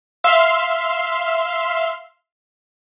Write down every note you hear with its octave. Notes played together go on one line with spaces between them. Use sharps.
E5 F5 C6